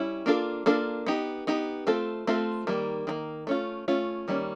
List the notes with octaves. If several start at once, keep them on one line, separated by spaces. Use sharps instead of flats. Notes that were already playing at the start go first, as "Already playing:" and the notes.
Already playing: G3 C#4 E4
A#3 D4 F4 A4
A#3 D4 F4 A4
B3 D#4 G4
B3 D#4 G4
A3 C4 F4 A4
A3 C4 F4 A4
D#3 G3 A#3
D#3 G3 A#3
A3 C#4 F4
A3 C#4 F4
D#3 G3 A#3 C#4